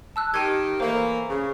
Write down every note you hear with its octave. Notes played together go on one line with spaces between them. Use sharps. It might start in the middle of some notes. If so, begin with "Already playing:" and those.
A5 E6 F#6
D#3 G4 G#6 D#7
E3 A3 A#3 C5
C#3